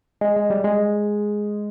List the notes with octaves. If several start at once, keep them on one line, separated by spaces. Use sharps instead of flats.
G#3
G#3
G3
G#3